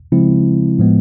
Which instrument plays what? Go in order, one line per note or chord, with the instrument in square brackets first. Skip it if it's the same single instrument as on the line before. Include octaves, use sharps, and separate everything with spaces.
[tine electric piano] C#3 F3 G#3 C4 E4
A2 F3 G#3 B3